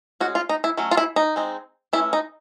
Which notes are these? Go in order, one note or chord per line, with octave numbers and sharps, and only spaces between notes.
G#3 C#4 F#4
F4
D#4
E4
F#3 A3 C#4
F4
E4
D#4
G#3 C4 D#4
E3 A3 C#4 E4
D#4